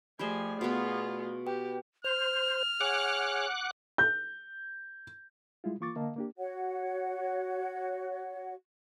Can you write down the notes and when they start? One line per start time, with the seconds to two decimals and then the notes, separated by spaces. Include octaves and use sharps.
0.19 F3 A3 G4 G#4 C5 D5 G#5 B5
0.61 B2 B3 F4 G#4
1.47 G4 B4 G5
2.04 C5 F6 F7
2.81 G#4 C#5 F#5 D6 F#6
3.98 G6
5.64 G3 G#3 E4 F4
5.80 E3 A#3 F4 C#6 D6 A6
5.96 D3 A#3 D#5 F5 A5
6.16 A#3 D4 G4
6.38 F#4 C#5 F#5